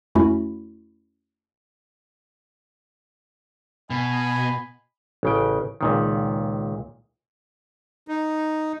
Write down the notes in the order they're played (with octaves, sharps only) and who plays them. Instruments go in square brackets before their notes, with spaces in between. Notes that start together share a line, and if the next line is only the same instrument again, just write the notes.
[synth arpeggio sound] F2 A3 C#4 E4 F#4 B5
[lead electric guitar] B2 [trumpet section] D#5 G#5 B5
[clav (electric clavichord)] A1 C#3 G5
C#2 A#2 D#3
[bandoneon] D#4